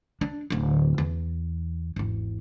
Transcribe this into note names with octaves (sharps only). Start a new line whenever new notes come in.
D4
D1 D2
E2
G#1 E2